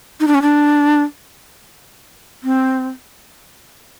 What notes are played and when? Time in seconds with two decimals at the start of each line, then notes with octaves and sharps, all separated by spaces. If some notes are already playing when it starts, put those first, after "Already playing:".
0.20 D#4
0.27 D4
0.35 C#4
0.42 D4
2.43 C4